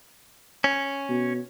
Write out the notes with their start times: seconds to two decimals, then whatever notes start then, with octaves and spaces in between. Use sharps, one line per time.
0.64 C#4
1.09 B2